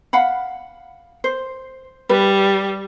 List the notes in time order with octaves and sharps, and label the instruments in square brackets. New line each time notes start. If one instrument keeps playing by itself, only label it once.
[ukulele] F5 F#5 B5
C5
[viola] G3 [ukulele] B4